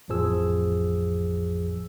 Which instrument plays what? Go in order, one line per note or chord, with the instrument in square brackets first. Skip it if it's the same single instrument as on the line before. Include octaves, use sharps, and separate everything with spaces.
[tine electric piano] A1 F2 A2 F3 G#4 E6